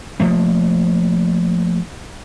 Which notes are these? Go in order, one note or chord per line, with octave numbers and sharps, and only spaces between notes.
F3 A3 A#3